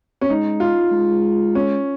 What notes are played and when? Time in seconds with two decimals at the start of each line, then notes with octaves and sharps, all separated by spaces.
0.21 C#4
0.30 G#3 D#4
0.60 F4
0.92 G#3
1.55 C#4